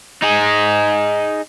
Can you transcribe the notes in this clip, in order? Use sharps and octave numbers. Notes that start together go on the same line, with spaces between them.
D#4 G#4